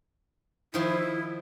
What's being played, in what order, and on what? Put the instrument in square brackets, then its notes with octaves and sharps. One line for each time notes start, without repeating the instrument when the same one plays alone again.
[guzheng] D#3 F3 C6 [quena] E4